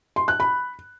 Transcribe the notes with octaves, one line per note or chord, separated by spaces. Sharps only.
C6
F#6
B5